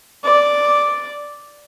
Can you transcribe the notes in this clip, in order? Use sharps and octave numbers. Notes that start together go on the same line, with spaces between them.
D5